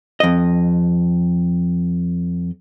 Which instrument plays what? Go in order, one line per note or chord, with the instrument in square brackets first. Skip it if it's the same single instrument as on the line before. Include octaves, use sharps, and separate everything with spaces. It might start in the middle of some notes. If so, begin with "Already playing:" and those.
[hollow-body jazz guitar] F2 D#5